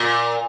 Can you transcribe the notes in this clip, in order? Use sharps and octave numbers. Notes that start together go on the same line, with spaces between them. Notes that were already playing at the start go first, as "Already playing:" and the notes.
Already playing: A#2